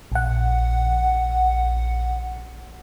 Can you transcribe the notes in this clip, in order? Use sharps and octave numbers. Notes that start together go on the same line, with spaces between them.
A#1 F#5